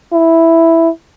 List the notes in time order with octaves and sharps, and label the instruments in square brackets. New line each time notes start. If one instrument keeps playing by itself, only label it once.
[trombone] E4